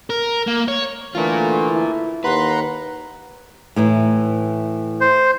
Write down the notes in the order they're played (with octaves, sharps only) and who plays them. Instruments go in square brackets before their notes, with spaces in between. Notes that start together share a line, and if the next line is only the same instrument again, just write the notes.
[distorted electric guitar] A#4
A#3
C#5
[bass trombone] D3 [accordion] E3 A3 [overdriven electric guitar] F4 A#4
[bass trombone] E4
[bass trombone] D#2 [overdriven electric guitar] B4 [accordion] F#5 A#5 C6
[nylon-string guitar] A2 E3 D#4
[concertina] C5